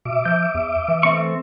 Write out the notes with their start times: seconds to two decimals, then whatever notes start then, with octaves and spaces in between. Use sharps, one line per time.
0.05 B2 E5 D6
0.25 F3 G6
0.55 E2
0.88 E3
1.03 A3 C4 C#6